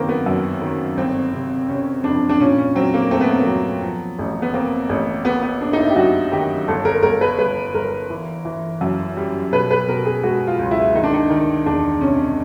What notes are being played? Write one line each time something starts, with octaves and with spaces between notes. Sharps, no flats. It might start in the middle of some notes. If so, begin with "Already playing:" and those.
Already playing: F#2 D#3 A#3 C4
B3
F#2
D#3
G1 C4
C3
C3 C#4
F2 D4
D4
A#2 C#4
C#4
F#3 C4
A#3
A3 C4
B3
A#3
B3
F#3
F3
A1
B3
A#3 C4
A1
A#3 B3
B3
A#3 D4
D#4
E4
G4
F#2 F#4
D#3 G4
G1 A4
A#4
G1 A#4
B4
G1 B4
G1 A#4
E3
E3
F#2
G3
B2 B4
B4
B2 A#4
G#4
G#3 F#4
F4
C#2
E4
D#3 D#4
D4
D#4
D#3
E2 D4
C3 C#4